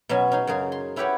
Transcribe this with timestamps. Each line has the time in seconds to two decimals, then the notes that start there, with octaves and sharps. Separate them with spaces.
0.09 B2 F#3 C#4 G#5
0.32 C#4 D#4 G#4
0.47 F#2 C#3 G#4
0.72 C6
0.96 C#4 E4 F#4 G4 B4 C#5